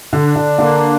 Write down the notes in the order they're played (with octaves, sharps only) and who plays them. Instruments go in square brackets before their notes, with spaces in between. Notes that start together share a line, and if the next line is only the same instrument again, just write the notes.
[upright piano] D3
[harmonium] D4
[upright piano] D3
[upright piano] D3 [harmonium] A#3